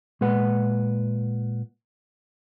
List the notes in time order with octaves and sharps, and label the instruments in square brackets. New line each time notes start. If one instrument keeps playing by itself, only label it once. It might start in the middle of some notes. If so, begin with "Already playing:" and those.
[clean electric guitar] A#2 G#3 B4 F#5